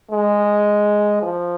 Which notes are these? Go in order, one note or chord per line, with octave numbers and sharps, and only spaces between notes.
G#3
F3